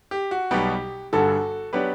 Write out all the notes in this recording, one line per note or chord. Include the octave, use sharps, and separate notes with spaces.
G4
F#4
B1 B2 G3 B3 G4
G1 G2 D3 F#4 A4
F#3 B3 D4 G4 B4